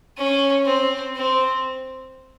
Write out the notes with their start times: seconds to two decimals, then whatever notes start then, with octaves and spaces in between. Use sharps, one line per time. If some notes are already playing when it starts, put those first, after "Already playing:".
0.18 C#4
0.66 C4
1.15 C4